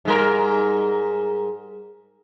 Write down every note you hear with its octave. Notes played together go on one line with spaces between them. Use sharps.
G#2 G3 A#4